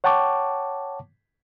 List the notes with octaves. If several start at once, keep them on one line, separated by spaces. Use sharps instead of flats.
C#5 F#5 G5 A5 C#6 D6